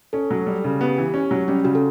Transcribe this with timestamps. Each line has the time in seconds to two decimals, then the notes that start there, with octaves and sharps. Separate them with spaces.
0.13 C#4 A4
0.31 F#3
0.46 G3
0.64 C#3
0.81 B3 G4
0.98 E3
1.14 C#4
1.31 F#3
1.48 G3 C#4
1.64 C#3 F#4
1.75 A4